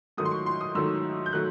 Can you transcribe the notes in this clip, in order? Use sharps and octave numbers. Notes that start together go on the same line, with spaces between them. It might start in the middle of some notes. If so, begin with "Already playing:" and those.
G#2 D#3 F#3 A3 D#6
C6
C#6
C6
D#6
G#2 D#3 F#3 A3 E6
G6
D#3 F#3 A3 F#6